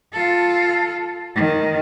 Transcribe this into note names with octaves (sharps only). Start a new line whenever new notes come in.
F4 A4
D#3